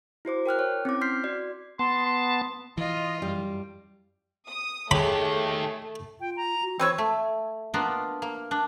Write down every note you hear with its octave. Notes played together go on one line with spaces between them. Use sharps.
E4 F#4 C5 D6
A#4 G5 F6 F#6
C#5
C4 C#4 E4 D6
C6 D6 F6 G6 B6 C7
F#4 D5
B3 A5 C6
C6
E3 F4 D#5
F#2 G3
D#6
D#3 A3 G4 G#4 C#5 B5
F4 G5
A#5
F#4
E3 C4 B4 C#5 E6
A3
A#3 B3 D4 F4 A#4
A#3
D4